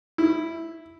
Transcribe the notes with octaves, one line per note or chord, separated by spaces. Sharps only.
E4